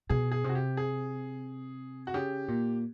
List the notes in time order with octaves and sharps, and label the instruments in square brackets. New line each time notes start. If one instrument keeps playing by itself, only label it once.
[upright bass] B2 [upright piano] G#4
[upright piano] G#4
[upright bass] C3
[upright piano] F#4
G4
G#4
F#4
[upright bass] C#3 [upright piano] G4
[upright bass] A#2